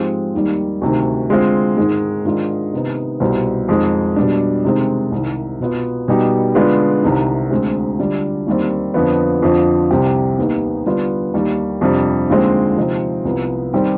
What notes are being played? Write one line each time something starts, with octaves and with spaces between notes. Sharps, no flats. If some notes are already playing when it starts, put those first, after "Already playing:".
Already playing: G#2 F3 G#3 C4 G4
D#2 D#3 G3
D2 C3 D#3
D3 G#3 C4 F4
G#2 D#3 G#3
G#2 D#3 G#3 D4 F4
C3 D#3 B3 D#4
C2 B2 G3 C4
F2 D#3 G#3
B2 G3 D4
C3 D#3 G#3 C4
C2 C3 D#3
B2 B3 F4
B2 G3 B3 D#4 G4
D3 G#3 B3 D4 F4
C2 C3 D#3
D2 D3 G#3 C4
D3 G3 D4 F4
D#2 D#3 G3 C4
F2 D3 F3 B3
F2 D3 F3
C2 C3 G3 C4 G4
D#2 D#3 B3 D#4 G4
D3 G3 B3 D4 F4
D#2 D#3 G3
F2 C3 G3 D4
D#2 D3 F3 G#3 C4
C3 F3 C4 D#4
C2 C3 F3 B3
D#3 G3 C4 G4